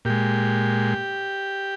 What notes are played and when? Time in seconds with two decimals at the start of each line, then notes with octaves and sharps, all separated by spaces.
0.05 A#2 G#3 G4